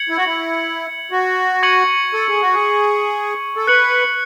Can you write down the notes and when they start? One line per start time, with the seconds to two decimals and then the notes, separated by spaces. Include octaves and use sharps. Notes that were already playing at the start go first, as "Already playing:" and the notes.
Already playing: G#6 C#7 F#7
0.09 E4
0.17 F#4
0.26 E4
1.11 F#4
1.63 C#6 G#6 C#7 F#7
2.14 A4
2.28 G#4
2.41 F#4
2.54 G#4
3.56 A4
3.67 B4 F#6 C#7 F#7